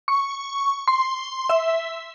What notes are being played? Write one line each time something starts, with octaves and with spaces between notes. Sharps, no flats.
C#6
C6
E5